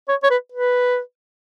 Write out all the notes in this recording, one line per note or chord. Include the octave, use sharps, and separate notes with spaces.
C#5
C#5
B4
B4